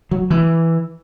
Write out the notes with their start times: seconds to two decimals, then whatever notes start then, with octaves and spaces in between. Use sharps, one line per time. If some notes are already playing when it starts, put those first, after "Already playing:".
0.11 F#3
0.30 E3